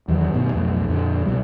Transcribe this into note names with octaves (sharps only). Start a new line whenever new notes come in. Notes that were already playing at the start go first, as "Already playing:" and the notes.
E2 D#3 F#3
G1 G2 B2 D#3
B1 F2 A2 F#3
F2 A#2 D3
B1 B2 F#3 G3